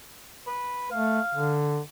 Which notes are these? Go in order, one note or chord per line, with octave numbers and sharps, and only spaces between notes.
B4
A3 F5
D3